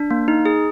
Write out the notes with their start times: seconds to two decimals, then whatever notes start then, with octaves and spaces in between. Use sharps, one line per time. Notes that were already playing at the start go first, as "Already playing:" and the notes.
Already playing: D4
0.11 A#3
0.28 D#4
0.45 G#4